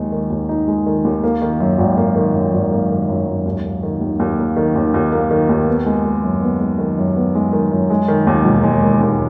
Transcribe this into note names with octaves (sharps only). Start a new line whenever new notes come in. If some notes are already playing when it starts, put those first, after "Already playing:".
Already playing: D#2 D#3 G#3 D#4
D#3
D#2
D#4
G#3
D#3
D#2
A#3
D#3
F#2
G#1
A#3
D#3
F#2
G#1
A#3
D#3
F#2
G#1
D#2
A#3
D#3
D#2
D#2
A#3
D#3
D#2
D#2
A#3
D#3
D#2
B3
G#3
D#3
F#2
B3
G#3
D#3
F#2
B3
G#3
D#3
F#2
G#3
D#3
D#2
E1
G#3
D#3
D#2